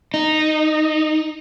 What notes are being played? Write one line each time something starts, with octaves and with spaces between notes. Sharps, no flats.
D#4